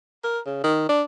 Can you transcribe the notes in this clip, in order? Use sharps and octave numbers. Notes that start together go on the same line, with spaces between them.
A#4
C#3
D#3
D4